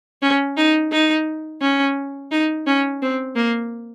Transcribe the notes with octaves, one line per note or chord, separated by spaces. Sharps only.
C#4
D#4
D#4
C#4
D#4
C#4
C4
A#3